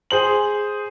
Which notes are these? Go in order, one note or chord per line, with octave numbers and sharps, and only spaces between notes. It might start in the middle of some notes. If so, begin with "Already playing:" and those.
G#4 C5 F#7